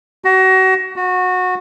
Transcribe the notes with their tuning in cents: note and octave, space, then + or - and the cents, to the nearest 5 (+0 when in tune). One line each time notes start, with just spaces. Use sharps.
F#4 +30
F#4 -20